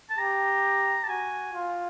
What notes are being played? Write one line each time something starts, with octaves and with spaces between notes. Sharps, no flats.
A5
G4 A#5
A5
F#4 G#5
F4